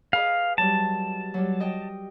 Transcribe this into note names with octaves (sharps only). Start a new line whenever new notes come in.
G#4 B4 D#5 F5
F#3 G3 A5
F#3 G3
D#5 G5